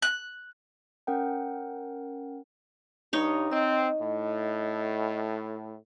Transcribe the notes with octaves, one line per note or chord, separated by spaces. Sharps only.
F#6
C#4 A#4 F#5 G5
G2 D#4 C#5
C4 D#5
A2